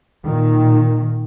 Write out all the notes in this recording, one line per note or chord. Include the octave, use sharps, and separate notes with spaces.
A#2 D#3